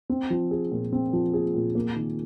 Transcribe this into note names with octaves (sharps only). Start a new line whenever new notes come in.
C4
F3
G#4
A#2
C4
F3
G#4
A#2
A#3
D#3